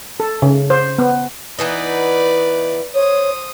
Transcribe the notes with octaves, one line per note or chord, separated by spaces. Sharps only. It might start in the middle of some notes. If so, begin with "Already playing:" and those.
A4
C#3
C5
B3
E3 B3 D#4 B4 D5
C5 C#5 D#6